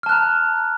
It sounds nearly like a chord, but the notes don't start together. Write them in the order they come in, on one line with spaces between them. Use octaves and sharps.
F6 A5 F#6 A#5